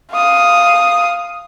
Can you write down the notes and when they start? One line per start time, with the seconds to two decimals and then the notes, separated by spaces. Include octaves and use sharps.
0.13 F5 D#6